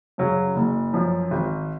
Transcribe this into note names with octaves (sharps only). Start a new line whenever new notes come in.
F#2 C#3 F#3
F#1
F#2 F3
G#1